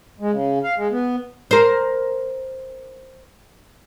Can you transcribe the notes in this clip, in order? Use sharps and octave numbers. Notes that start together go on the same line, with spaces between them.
G#3
C#3
F5
G#3
B3
A#4 C5